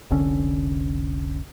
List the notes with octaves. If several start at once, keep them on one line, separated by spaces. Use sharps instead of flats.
F1 C2 D3 C#4